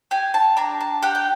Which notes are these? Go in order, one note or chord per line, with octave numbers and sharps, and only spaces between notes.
G4 G#5
A5
D4 A#5
A5
G4 F#5
G5